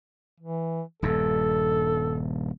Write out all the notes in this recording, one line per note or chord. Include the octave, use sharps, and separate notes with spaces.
E3
D#1 G2 A4